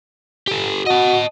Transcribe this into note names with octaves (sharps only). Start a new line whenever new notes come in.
G4 A4
F#4 D#5 A5